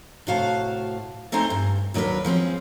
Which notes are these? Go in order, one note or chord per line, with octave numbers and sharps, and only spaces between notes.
A2 C3 F#4 F5 A5
A3 C4 D#4 C5 G#5 A#5
G2
D#2 F#3 D4 G#4 A#4 B4
F3 G#3 C4 C#4